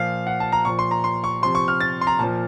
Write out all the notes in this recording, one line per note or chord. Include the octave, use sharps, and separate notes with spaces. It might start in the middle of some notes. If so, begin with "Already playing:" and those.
Already playing: A#2 F3 F5
F#5
A5
A#5
A#2 F3 C#6
C6
A#5
C6
C#6
C3 F3 C6
C#6
F6
A6
C6
A#5
A#2 F3 A5